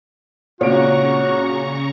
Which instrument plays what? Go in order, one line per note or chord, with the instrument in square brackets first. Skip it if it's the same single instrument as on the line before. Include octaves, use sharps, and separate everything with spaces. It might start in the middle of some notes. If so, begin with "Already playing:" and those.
[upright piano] G#1 A#2 D7 [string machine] C#3 A#5 C#6 [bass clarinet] F#4 [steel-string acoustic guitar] C#5